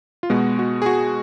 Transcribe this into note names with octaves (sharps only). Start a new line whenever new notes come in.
F4
B2 G#3 B3 F#4
F#4
G#4
F#4